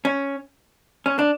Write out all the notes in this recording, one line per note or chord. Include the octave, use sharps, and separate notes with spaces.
C#4
C#4
D4